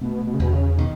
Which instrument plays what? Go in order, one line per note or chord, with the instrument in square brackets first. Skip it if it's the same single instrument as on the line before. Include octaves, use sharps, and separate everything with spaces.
[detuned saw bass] B2 [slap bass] A3
[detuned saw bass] B2
C#3
[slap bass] E2 [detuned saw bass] B2
[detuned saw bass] C#3
[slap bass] B2 [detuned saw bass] D#3